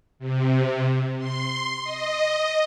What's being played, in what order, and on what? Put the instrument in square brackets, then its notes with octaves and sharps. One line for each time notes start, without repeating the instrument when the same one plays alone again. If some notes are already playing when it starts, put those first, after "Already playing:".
[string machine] C3
C6
D#5